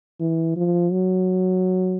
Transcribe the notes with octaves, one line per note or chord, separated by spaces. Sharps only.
E3
F3
F#3